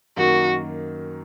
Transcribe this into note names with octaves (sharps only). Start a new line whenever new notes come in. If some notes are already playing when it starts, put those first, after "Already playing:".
F#2 D#3 A#3 F#4